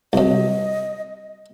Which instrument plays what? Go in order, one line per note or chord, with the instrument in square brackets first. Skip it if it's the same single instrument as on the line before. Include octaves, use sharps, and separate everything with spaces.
[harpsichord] C2 F#2 [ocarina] D#5